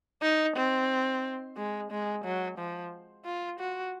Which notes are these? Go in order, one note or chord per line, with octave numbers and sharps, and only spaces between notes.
D#4
C4
G#3
G#3
F#3
F3
F4
F#4